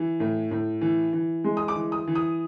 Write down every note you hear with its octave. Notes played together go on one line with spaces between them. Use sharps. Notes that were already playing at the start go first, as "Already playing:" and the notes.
Already playing: E3
A2
A2
E3
E3
G#3
D#6
D6
E3
D#6
E3
D#6